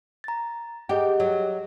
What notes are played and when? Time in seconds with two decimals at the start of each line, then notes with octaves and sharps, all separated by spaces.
0.24 A#5 A6
0.89 G4 G#4 D#5 F#5
1.20 F#3